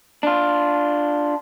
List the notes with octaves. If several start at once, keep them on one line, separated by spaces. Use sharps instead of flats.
D4 F4